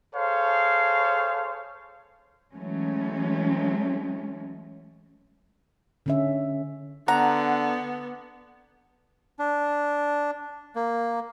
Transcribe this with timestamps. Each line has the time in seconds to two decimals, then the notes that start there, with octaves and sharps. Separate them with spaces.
0.14 G#4 A4 C5 C#5 F5
2.54 E3 F#3 G#3 A3 C#4
6.06 D3 C#4 E5
7.08 D3 B3 F#5 A#5
9.39 D4
10.76 A#3